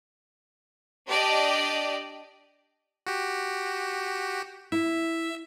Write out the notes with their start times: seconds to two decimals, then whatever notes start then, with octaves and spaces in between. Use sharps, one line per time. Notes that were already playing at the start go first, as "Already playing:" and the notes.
1.09 D4 G4 D5 D#5
3.07 F#4 G4
4.72 E4 E5